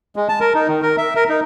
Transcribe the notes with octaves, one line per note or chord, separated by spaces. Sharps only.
G#3
A5
A#4
D#4
D#3
A#4
E5
A#4
D#4